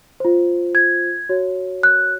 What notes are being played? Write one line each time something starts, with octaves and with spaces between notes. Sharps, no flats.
F4 C5
G#6
F#4 C#5
F#6